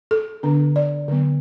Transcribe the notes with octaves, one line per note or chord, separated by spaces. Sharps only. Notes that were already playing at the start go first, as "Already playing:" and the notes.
A4
D3 B3 D4
D5
D3 F#3 B3